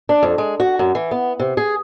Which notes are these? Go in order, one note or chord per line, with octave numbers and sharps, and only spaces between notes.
D4
F2
G#3
F#4
F#2
E3
B3
C3
G#4